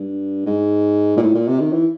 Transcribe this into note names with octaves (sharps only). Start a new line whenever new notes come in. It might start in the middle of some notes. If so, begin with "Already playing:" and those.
Already playing: G2
G#2
A#2
A2
A#2
C3
D#3
E3